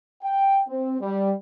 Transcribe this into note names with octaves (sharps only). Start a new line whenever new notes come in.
G5
C4
G3